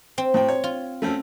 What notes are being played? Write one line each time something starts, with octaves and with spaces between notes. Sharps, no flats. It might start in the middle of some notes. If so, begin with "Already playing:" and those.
C4
A2 G5
C#5
F4
A3 C4 C#4